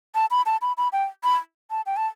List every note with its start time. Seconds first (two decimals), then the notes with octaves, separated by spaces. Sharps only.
0.15 A5
0.31 B5
0.46 A5
0.62 B5
0.78 B5
0.93 G5
1.24 B5
1.71 A5
1.86 G5
1.97 A5